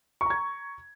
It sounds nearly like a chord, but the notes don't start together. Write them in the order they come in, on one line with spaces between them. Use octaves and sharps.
C#6 A#5 G#6